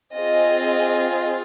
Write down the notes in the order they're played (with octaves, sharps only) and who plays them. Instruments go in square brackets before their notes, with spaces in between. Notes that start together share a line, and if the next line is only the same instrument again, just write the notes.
[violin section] C4 F4 G#4 D#5